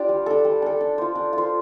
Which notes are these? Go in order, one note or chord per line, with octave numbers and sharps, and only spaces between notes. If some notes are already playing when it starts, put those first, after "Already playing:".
Already playing: D4 F4 G4 C5 D5
G3
D4 A4
G3
D4 A4
D4
F4 C5
D4
F4
C5